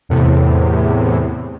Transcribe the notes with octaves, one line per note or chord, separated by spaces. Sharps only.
E2 A2 C3